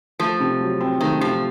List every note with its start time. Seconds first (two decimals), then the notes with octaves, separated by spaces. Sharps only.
0.19 F3 A3
0.40 C3
0.60 F#3
0.81 C4
1.01 D#3 A3
1.21 C3 F3